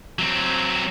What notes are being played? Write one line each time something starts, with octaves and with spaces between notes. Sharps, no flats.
F#3 C4